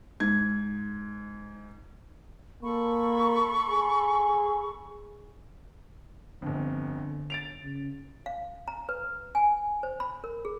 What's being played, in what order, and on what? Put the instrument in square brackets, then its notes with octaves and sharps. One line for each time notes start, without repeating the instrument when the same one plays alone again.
[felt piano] G#2 G#6
[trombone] A#3 [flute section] A4 B5 C#6
[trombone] G#4
[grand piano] G1 F2 [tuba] D3
[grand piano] A6 D7 F7
[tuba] C#3
[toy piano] F5
A#5
B4
G#5
C5
B5
A#4
G#4